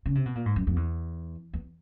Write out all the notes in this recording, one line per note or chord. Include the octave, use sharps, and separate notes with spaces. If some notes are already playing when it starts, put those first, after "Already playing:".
C#3
C3
B2
A#2
G#2
F#2
F2
E2
E2